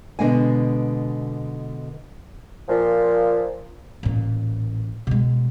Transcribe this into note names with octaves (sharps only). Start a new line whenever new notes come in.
B2 D3 G#3 G#5
A#2 F3
A1 A#2
B2 G#3